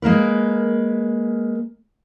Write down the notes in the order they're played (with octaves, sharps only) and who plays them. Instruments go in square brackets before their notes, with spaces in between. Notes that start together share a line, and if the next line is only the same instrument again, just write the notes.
[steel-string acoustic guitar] G#3 A#3 A#4 B4